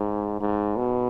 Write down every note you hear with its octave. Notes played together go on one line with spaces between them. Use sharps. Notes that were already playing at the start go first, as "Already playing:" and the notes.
Already playing: G#2
G#2
B2